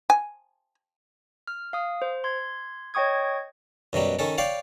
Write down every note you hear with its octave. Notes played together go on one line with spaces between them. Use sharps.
G#5
F6
F5 D#6
C5
C6 G#6
C#5 D#5 G5 C#6 D#6 G#6
F#2 B2 F#3 G3
D#3 C#4 A4
C#5 D5 F5 G5